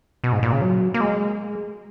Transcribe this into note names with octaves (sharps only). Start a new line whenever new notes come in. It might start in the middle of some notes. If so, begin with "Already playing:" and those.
B2
G#2
A#2
C#3
F#3
A#3
G#3